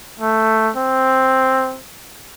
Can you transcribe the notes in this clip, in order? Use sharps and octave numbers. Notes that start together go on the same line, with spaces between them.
A3
C4